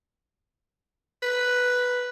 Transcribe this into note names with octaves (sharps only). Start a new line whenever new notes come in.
B4